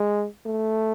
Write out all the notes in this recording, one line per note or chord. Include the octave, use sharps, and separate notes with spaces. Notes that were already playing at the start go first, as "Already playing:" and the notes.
Already playing: G#3
A3